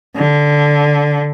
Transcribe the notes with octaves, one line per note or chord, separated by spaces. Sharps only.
D3